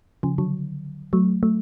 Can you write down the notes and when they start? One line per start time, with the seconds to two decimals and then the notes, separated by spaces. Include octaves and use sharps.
0.23 C#3 F3
0.38 D3 F#3
1.13 F#3 A3
1.43 F#3 A3